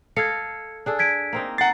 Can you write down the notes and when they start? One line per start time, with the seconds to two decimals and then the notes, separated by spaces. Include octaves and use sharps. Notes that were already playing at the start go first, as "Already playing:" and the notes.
0.16 A4 D#5 F5 G#6 C#7
0.86 D4 G#4 A4
0.99 G#6 B6 D7
1.33 A#3 C4 D#4
1.58 F#5 A#5 A6 C7